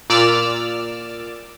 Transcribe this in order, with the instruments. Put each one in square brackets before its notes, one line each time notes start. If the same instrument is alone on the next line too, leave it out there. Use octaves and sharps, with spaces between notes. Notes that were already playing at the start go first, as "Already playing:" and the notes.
[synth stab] A#2 D5 D6 E6 F6